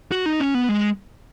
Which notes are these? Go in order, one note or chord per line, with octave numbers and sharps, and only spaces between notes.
F#4
D#4
C#4
B3
G#3